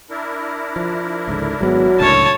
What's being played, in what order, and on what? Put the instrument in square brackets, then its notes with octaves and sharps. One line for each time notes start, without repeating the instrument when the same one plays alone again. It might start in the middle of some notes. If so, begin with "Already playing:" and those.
[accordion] D4 E4 A#4
[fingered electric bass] F3
C#2 G#2 D3
[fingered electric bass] G#1 G#3 B3 [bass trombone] F#3
[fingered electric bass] C#2 A2 D3 [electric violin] C#5 A5